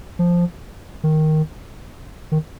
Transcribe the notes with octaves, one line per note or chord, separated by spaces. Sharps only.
F3
D#3
D#3